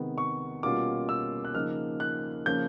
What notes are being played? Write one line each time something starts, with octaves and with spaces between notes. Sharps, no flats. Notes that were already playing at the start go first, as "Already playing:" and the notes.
Already playing: C3 D#3 G#3 B3
C#6
B2 G3 A#3 C#4 F4 D6
E6
F#6
C#3 F3 A#3 D#4 F6
F#6
C#3 F3 A#3 C#4 G6